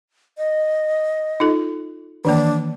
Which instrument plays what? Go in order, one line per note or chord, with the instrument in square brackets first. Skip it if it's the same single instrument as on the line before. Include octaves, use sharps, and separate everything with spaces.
[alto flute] D#5
[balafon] D#4 F4 A4
[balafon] D#3 E3 A#3 [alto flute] D4